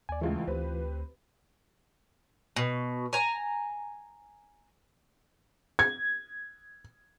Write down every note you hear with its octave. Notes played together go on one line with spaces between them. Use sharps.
D#2 D5 G#5
C#2 E3 G#3 A3 F4
D2 C4 G4 B4
B2
G#5 A#5
G#6